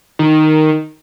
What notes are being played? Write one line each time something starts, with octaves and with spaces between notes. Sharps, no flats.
D#3